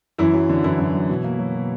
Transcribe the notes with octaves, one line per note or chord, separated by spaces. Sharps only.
F#2 E3 E4
F#3
D3
F#2 E3 E4
F#2
F#3
B2
A#3
F#3
B2